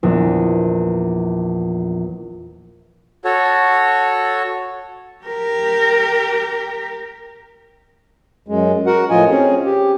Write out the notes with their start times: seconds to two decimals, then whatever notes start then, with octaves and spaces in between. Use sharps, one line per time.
0.03 A#1 E2
3.25 F#4 A4 C#5
5.25 G4 A#4
8.48 F#2 G#3
8.86 F#4 A#4 F#5
9.10 A2 F3 F4 D#5 G#5
9.29 C4 C#4 G#4
9.64 G4